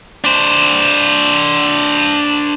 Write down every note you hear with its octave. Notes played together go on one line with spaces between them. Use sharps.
D4 C5